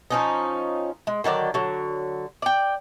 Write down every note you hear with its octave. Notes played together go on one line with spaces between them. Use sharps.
F3 C#4 D#4
G#3
D3 D#3 F#3 D5
D3 F#3
D5 G5